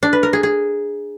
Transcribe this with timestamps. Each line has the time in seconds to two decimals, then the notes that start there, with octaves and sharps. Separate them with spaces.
0.03 D4
0.13 B4
0.23 A#4
0.33 G#4
0.43 G#4